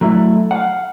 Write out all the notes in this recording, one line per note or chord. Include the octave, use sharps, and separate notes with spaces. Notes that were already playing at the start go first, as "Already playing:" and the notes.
F#3 A3 E4
F5 F#5